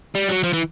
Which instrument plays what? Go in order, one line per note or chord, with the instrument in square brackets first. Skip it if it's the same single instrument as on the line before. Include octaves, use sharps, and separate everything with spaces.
[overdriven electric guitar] G3
F#3
F3
E3